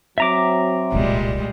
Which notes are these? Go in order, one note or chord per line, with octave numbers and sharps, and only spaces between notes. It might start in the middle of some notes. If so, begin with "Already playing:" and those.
F#3 C4 E5 A#5 D6
D1 C2 A#2 G3 G#3